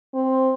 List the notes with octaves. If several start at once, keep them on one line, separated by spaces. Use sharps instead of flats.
C4